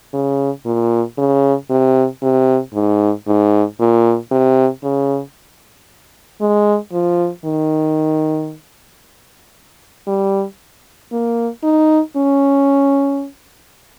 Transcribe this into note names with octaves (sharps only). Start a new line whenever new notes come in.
C#3
A#2
C#3
C3
C3
G#2
G#2
A#2
C3
C#3
G#3
F3
D#3
G3
A#3
D#4
C#4